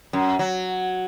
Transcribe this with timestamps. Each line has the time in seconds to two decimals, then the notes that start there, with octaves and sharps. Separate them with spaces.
0.13 F#2
0.39 F#3